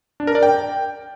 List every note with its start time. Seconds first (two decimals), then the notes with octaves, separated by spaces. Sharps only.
0.20 D4
0.27 A#4
0.35 D5
0.43 G5